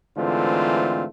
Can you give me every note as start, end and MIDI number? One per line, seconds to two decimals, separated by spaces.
0.17 1.04 44
0.17 1.04 50
0.17 1.04 52
0.17 1.04 57
0.17 1.04 60
0.17 1.04 65